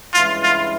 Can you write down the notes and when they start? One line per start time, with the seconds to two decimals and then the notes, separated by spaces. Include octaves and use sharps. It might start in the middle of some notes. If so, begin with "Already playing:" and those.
0.13 G2 E3 G#3 C#4 E4 F4
0.43 F4